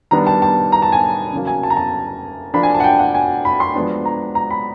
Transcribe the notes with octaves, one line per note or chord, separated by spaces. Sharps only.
D#3 G3 B3 D4 A#5
A5
A5
A#5
A5
G#5
C#3 F#3 A#3
G#5
A5
A#5
A5
F3 A#3 D4 B5
G#5
A5
F#5
G5
F#5
G#5
B5
C6
F3 G#3 B3 D4
A#5
A#5
B5